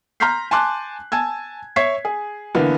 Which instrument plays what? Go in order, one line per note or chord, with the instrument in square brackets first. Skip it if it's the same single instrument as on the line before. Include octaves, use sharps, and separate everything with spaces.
[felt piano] A#5 C6 F6 G6 B6 C7
G#5 A5 C6 D6 F#6
G#5 A5 E6 G#6
C#5 E5 C#6 G#6 B6 C7
G#4
D3 E3 A#3 B3